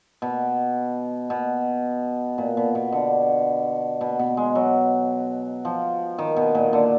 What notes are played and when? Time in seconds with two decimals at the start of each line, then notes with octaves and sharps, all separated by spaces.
0.22 B2
1.30 B2
2.38 A#2
2.57 B2
2.75 B2
2.92 D3
4.01 B2
4.19 B2
4.37 G#3
4.55 F#3
5.65 F3
6.18 D#3
6.37 B2
6.55 A#2
6.73 D3